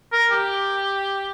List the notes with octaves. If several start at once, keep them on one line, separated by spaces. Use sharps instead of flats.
A#4
G4